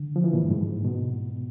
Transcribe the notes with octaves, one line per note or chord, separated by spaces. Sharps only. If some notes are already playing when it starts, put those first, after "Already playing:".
Already playing: D3
F3
E3
A#2
G2
G#2
B2